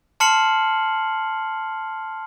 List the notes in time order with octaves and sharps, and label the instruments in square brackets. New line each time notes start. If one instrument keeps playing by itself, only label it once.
[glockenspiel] A5 C6 F6 C7 C#7 F#7